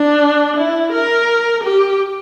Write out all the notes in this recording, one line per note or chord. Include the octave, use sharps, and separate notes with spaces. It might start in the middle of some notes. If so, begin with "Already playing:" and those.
Already playing: D4
E4
A#4
G4